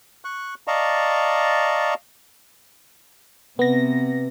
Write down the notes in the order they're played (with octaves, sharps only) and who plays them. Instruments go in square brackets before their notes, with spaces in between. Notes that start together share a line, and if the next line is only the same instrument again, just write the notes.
[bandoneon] C#6 F#6
D5 D#5 F5 A5 A#5 C#6
[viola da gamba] C3 [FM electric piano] B3 A#6